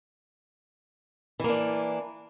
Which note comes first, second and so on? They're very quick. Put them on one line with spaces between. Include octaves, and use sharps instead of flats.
E3 A#3 D4